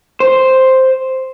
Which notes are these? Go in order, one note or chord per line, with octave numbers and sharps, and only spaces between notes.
C5